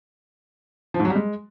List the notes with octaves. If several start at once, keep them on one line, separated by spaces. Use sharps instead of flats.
F3
G#2
F#3
G3
G#3